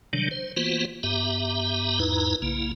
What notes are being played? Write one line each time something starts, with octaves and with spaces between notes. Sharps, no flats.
C3 D#3 F#3 G3 D4
C5
E3 A#3 B3 F4 F#4 C5
G2 B3 G4 E5 A#5
E2 G#2 D#4 E4 B4 A#5
B1 C#3 A#3 E4